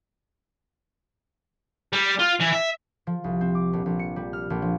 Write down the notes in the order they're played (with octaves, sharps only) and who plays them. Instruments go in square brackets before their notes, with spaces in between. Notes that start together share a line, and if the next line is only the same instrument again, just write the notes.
[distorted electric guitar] G3
F4
E3
E5
[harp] F3
C2
C4
D6
A#1
A#1
C#7
G3
F6
A#1
F3